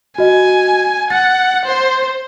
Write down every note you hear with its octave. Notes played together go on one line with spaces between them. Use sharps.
F#4 D#5 G#5
F#5 A6
C5